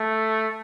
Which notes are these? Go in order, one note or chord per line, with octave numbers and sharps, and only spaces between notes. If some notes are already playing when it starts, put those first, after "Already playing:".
Already playing: A3